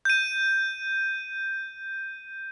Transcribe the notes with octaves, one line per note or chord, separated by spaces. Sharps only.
G6 D#7